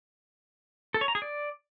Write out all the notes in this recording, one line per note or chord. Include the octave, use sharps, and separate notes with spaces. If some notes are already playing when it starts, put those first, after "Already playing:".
A4
C#5
A#5
G#4
D5